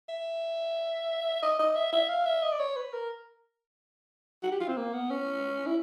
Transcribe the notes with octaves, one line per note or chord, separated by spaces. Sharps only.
E5
D#5
D#5
E5
E5
F5
E5
D#5
D5
C#5
B4
A#4
F#4
G4
F4
C4
A#3
B3
C#4
E4